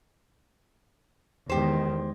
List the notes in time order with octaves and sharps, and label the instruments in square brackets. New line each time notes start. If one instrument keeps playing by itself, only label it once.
[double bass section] E2 D#3 [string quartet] G#3 [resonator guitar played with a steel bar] G4 C5